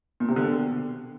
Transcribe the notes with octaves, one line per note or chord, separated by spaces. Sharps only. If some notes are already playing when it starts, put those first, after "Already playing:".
A#2
C3
D3
B2